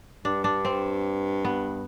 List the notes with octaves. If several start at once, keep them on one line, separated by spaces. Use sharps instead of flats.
G2 D4
D4
C4
B3